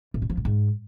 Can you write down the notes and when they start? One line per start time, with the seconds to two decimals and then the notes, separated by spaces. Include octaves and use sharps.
0.14 A2
0.22 D3
0.30 F3
0.37 A2
0.45 G#2